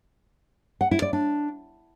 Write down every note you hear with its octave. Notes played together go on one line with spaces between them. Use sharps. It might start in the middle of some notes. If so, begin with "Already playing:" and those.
F#5
E4
D5
D4